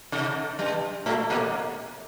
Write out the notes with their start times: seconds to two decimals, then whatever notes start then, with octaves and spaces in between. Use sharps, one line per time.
0.12 C3
0.59 G2 G3
1.06 A2 A3
1.30 A#2 A#3